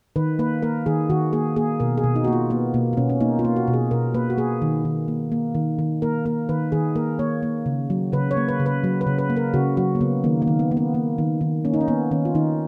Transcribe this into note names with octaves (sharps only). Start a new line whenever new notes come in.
D#3 B4
A#3 B4
A#3 A#4
D#3 G#4
D#3 F#4
A#3 G#4
A#3 G#4
B2 A#4
G#4
B2
D#4
A#3 F#4
F4
A#3 B3
B2 A#3
B3
B2 C#4
C#4
A#3 D#4
F4
A#3
F#4
B2
G#4
B2 A#4
A#3 B4
F#4
A#3 G#4
D#3
D#3
A#3
A#3
D#3
D#3
A#3 A#4
A#3 A#4
D#3 B4
D#3 G#4
A#3 A#4
A#3 C#5
A#3
C#3
F#3
C#3 B4
C#5
A#3
B4
C#3
B4
F#3
B4
C#3
B4
A#3
A#4
C#3 F#4
F#3 F#4
A#3
C#3 B3
D#3 A#3
A#3
D#3
B3
A#3
B3
A#3
D#3
D#3
A#3 C#4
D#4
C#4
A#3 B3
D#3 C#4
F4
D#3 D#4